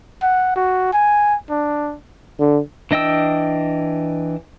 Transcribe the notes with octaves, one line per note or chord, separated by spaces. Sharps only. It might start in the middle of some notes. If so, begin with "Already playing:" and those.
F#5
F#4
G#5
D4
D3
E3 D4 D#5 G5 E6